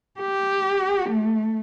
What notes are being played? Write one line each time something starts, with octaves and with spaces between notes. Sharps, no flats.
G4
A3